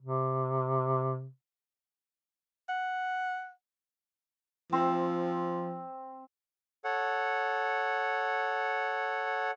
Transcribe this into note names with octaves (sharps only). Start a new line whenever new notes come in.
C3
F#5
F3 C4 C5
A4 C#5 F#5